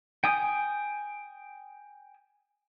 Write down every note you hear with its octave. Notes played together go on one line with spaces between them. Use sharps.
G5 G#5 D#6